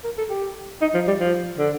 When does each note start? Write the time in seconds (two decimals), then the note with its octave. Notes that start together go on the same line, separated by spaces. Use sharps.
0.04 A#4
0.18 A4
0.30 G4
0.82 D#4
0.94 F3
1.07 G3
1.20 F3
1.59 D3